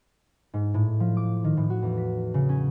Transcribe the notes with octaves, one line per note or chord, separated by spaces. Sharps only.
G#2
A2
F3
D6
D#3
A2
F#4
E2
B6
C#3
C#4